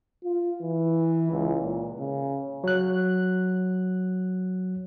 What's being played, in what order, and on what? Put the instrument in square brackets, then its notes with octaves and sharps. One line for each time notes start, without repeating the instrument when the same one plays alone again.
[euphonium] F4
E3
C#2
A#2
C#3
[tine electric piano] F#3 F#6